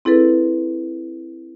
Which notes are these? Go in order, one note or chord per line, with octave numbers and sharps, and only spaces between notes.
C4 E4 G#4 A4 B4